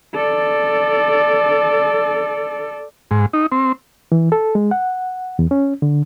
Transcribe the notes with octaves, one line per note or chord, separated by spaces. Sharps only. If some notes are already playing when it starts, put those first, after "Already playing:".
A4 D5
G#2
D#4
C4
E3
A4
G#3
F#5
E2
C#4
D3